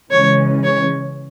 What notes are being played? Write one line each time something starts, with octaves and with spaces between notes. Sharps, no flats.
C#3 E3 G#3 C#4 C#5
C#5